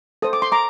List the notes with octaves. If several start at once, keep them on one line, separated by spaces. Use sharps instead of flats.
A4 C5 D#6
D6
C6
A#5 D6